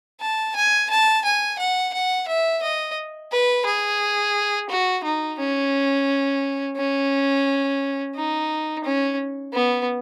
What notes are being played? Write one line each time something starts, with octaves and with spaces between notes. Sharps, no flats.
A5
G#5
A5
G#5
F#5
F#5
E5
D#5
B4
G#4
F#4
D#4
C#4
C#4
D#4
C#4
B3